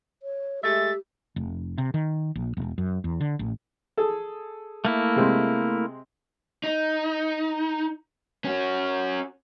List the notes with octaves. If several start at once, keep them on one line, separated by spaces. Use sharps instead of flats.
C#5
G#3 A3 G4 E5 A6
F1
C3
D#3
A#1
E1
F#2
E2
D3
A1
G#4 A4
A3 A#3 E4
C3 G#3 C4
D#4
C#4 F#4